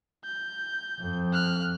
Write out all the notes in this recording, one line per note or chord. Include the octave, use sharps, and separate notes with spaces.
G6
F2
F6 F#6